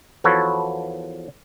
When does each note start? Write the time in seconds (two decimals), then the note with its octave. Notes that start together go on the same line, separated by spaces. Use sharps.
0.24 E2 F3 F#4 A4 B4 C#5